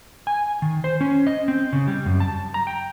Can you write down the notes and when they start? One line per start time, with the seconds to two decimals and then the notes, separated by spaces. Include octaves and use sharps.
0.27 G#5
0.62 D#3
0.84 C5
1.01 C#4
1.27 D#5
1.48 C4
1.73 C#3
1.87 G3
2.06 F#2
2.20 A5
2.54 A#5
2.67 G5